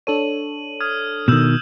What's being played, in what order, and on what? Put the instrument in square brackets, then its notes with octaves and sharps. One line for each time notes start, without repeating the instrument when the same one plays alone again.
[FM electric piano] D4 A4 C#5 [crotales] D#7 F#7
[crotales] D#6 F6 G#6
[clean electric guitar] B2 D#3 [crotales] E6 G6 E7